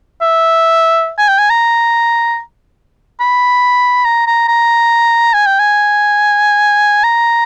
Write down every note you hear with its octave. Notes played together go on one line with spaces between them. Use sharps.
E5
G#5
G5
G#5
A#5
B5
A#5
A#5
A#5
G#5
G5
G#5
A#5